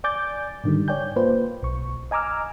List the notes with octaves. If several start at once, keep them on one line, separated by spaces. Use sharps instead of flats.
D5 G#5 D6 G6 A6
G#2 D3 D#3 G3
C#5 D5 G5 G#5 G6
A#3 F4 B4 C5
B1 C#6
D#5 G#5 A#5 D6 E6 F6